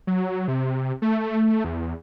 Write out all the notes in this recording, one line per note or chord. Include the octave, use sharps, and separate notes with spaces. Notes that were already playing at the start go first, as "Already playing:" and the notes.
F#3
C3
A3
E2